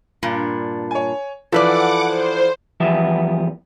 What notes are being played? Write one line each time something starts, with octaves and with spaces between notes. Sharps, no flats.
G2 A#2 D4
C#5 G#5
E3 F3 A4 B4 D5 F#5 D6
C5
E2 F3 G3 B3 E5